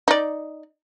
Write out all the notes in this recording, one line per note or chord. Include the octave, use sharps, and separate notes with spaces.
D#4 D5